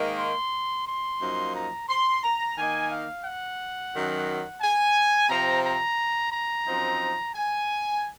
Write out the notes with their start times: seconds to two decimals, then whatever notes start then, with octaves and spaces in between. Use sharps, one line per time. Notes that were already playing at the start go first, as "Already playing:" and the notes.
Already playing: G#2 D#3 A#3 D#4
0.17 C6
0.86 C6
1.20 F#2 F3 A#3 D#4
1.55 A#5
1.89 C6
2.23 A#5
2.57 D#3 A#3 D#4 G#5
2.91 F5
3.25 F#5
3.94 F#2 D#3 F#3
4.61 G#5
5.29 C3 F3 C4 A#5
5.64 A#5
6.32 A#5
6.66 F#2 F3 C4 D#4
7.35 G#5